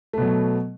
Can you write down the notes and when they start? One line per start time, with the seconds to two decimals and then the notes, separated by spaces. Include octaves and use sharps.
0.13 A3
0.18 B2
0.22 F#3